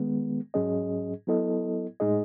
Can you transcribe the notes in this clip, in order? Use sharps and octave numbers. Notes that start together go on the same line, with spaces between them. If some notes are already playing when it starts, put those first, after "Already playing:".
Already playing: D#3 G#3 B3
G#2 F#3 C#4 G#4 D#5
F#3 B3 E4 A4 D#5
A2 G#3 D#4 G#4 D#5